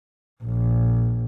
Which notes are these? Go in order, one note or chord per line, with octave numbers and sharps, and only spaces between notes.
A#1